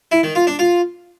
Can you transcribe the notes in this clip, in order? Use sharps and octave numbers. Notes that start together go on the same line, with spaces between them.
E4
D#3
F4
D4
F4